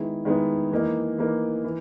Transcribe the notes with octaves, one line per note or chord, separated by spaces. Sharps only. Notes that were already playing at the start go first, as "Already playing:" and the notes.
Already playing: D#3 G#3 B3 E4
D#3 G#3 B3 E4
E3 A#3 D#4
E3 A#3 D#4
E3